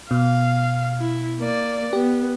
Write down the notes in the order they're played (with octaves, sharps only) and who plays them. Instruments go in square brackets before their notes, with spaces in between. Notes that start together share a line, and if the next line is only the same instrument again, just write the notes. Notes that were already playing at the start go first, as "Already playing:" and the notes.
[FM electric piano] B2 [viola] F5
[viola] E4
A#3 D5
[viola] B3 [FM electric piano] G4